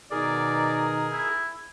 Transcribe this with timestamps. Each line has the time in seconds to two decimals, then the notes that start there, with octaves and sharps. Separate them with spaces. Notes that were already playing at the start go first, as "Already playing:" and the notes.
0.11 B2 D#3 D#4 G#4 A#4 D5
1.12 E4